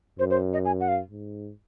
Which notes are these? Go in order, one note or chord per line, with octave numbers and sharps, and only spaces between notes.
F#2 C5
C5
D#5
G#5
F#5
F5
G#2